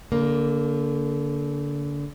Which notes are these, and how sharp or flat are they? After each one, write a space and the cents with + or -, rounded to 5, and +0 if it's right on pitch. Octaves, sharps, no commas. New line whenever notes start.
D3 -30 A#3 +0